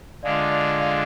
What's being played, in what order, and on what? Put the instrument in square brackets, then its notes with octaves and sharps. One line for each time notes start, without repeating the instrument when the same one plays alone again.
[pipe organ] D3 G#3 D4 F4 [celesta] D5 F5
[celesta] D5 F5
D5 F5